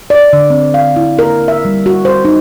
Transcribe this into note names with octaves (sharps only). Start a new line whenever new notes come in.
D5
D3
C4
F5
E4
A#4
E5
G3
F#4
C5
D#4